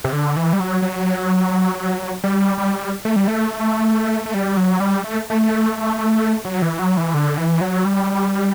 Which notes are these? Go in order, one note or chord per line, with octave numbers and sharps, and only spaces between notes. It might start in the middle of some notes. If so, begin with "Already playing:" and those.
C3
D3
E3
G3
F#3
F#3
G3
G3
A3
G3
A3
A3
G3
F#3
G3
A3
A3
F#3
E3
F#3
E3
D3
E3
F#3
G3